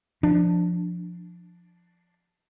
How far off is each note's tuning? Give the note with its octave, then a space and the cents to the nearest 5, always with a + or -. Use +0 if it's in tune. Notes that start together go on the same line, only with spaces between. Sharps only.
F3 +0 D4 +0